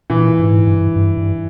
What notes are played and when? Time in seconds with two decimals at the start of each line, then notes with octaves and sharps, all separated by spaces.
0.10 A#2 E3
0.39 G#2
0.67 G2
0.96 G2
1.17 G2